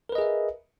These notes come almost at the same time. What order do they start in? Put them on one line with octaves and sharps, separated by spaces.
A#4 B4 D#5 G#4 E5